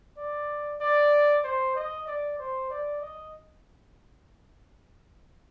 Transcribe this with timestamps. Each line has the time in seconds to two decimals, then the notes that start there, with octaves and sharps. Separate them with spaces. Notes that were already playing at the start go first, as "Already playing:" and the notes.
0.18 D5
0.81 D5
1.44 C5
1.75 D#5
2.07 D5
2.39 C5
2.70 D5
3.02 D#5